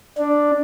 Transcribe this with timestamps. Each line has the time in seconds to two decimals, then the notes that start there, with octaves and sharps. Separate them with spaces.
0.18 D4